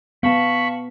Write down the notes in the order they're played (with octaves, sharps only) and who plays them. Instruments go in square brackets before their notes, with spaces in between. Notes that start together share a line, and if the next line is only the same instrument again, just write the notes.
[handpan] B3 [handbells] F5 A5 [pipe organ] B5 C#6